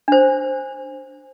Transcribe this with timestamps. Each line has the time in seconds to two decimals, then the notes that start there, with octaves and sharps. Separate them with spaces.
0.08 D4 C5